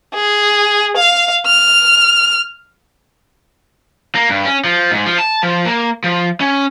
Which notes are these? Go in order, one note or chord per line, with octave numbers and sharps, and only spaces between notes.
G#4
F5
F6
A#3
G2
C#4
F3
G#2
F3
A5
F3
A#3
F3
C#4